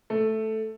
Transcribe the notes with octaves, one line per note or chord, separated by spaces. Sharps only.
A3